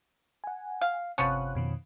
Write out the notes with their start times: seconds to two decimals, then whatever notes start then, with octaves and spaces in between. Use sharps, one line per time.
0.44 F#5 G#5
0.81 F5
1.18 G1 C3 F3 B3 C#4 F#6
1.55 F2 B2 D#3